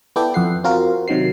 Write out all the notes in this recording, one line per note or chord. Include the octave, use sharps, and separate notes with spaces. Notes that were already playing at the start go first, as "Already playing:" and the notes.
B3 E4 A4 D5 G5
F2 F#5 C7
C4 F4 F#4 A#4
C3 D#3 F#3 C7